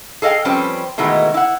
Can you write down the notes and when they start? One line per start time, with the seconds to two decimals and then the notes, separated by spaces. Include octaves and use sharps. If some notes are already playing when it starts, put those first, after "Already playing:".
0.22 G#4 A4 D#5 F5 G5
0.45 F3 G3 C4 C#4 B4
0.98 B2 D#3 E3 G#3 A3 B3
1.34 E4 F#5